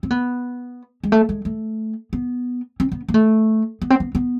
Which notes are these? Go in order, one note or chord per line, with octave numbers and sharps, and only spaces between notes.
C4
B3
G#3
A3
G#3
A3
B3
C4
B3
A#3
A3
B3
C4
B3
B3